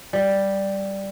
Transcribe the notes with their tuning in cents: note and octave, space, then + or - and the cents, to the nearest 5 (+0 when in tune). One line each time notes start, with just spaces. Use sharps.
G3 +0